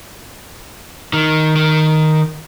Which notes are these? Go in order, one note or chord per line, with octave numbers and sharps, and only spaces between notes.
D#3
D#3